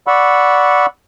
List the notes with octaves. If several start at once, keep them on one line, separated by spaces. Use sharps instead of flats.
D5 F#5 B5 C#6 E6